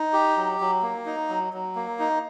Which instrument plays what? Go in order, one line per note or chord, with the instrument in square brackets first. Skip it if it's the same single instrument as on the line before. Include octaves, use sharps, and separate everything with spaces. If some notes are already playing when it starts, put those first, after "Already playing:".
Already playing: [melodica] D#4
G4
F#3
F#3
A#3
D#4
F#3
F#3
A#3
D#4